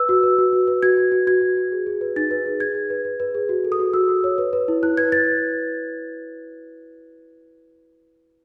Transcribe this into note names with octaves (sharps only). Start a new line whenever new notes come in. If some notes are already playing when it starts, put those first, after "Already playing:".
Already playing: B4 E6
F#4
B4
F#4
F#4
B4
F#4 G#6
F#4
F#4
F#4 G#6
F#4
F#4
G#4
G#4
B4
D#4 A6
B4
G#4
G#4 G#6
G#4
B4
B4
B4
G#4
F#4
A4
D#6
F#4
F#4 E6
F#4
C#5
B4
B4
E4
E4 F#6
B4 G#6
B4 A6